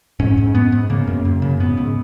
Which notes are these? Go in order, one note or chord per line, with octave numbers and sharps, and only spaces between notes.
G#2 C#4
G#2
G#2 B3
G#2
C#3 A#3
F#2
F#2
C#3
G#2 B3
G#2